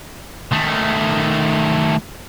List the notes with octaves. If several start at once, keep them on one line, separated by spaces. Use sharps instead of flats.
D#3 A3